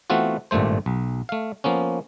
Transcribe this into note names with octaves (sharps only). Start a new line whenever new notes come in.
E3 A3 B3 C4 F4 F#4
G#1 G2 A#2 A3 C5
B1
A3 F5
F3 A#3 B3 C#4